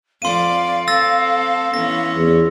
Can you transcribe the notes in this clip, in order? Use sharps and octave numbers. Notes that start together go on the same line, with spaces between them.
F2 D5 F5 C6 D#7
C4 A4 E6 A6 A#6
E3 B3 C#4 A#6
E2